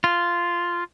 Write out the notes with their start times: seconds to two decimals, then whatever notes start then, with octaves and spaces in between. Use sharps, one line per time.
0.04 F4